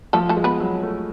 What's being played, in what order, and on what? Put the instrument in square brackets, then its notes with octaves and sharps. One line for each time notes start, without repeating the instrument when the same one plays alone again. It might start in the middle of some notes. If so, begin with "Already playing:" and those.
[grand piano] F3 [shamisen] A3 A4
[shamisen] A3 A4
[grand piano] G#3
[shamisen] B3 B4
[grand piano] F#3
A3